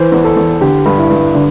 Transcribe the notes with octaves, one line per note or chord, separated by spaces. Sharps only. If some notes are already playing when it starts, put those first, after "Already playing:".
Already playing: E3 C5
E2
A4
E2
D3 G4
G2
E4
G2
D3 D4